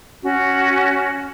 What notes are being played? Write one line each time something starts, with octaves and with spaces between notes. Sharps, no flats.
C#4 F#4